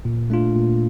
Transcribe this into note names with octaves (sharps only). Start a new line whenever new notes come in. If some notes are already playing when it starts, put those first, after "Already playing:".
A#2
A3 D4 F4
A#2